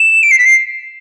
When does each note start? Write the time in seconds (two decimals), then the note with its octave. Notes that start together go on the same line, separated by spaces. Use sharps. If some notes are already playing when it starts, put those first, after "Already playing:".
Already playing: E7
0.23 D7
0.31 C7
0.38 B6
0.45 C7